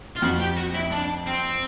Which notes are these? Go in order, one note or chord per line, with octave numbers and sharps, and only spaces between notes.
F4
F2 F#4
G4
F#4
E4
D4
C4